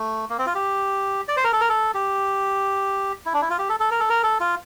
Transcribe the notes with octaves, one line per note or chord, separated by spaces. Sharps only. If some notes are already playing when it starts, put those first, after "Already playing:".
Already playing: A3
A#3
C4
F4
G4
D5
C5
A#4
A4
A#4
A4
G4
E4
D4
E4
F4
G4
A4
A4
A#4
A4
A#4
A4
F4